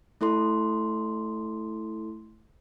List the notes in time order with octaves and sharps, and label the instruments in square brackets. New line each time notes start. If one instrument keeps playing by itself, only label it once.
[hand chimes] A3 E4 A4 C6